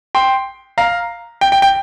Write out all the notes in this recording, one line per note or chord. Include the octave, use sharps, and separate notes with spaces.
G5 C6
F5 A#5
G5
G5
G5